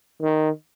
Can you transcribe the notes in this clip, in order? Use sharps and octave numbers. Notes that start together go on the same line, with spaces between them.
D#3